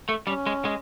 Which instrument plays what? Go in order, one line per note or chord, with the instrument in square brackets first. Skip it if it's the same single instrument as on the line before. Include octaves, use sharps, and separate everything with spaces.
[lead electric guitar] A3
[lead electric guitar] G3 [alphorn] C#4
[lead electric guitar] G#3
G#3